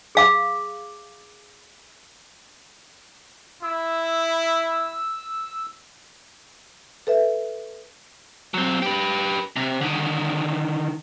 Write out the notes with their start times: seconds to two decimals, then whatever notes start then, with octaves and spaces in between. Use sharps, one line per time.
0.15 G#4 F5 D6
3.63 E4 E6
7.07 A4 B4 E5
8.54 F#3 C4
8.82 G4 B4
9.56 C3
9.81 D3 D#3